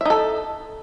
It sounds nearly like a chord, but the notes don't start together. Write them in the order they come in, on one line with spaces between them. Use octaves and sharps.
E5 D#4 A4